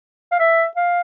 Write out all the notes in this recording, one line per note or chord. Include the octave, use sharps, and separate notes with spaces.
F5
E5
F5